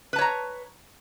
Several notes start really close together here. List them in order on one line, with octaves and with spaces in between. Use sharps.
B4 A5 C#5 A#5